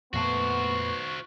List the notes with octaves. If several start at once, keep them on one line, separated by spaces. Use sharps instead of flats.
F2 A#2 A3 B3 F#4 C5 C#6